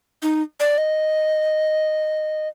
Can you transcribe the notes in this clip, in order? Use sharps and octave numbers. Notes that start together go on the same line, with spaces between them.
D#4
D5
D#5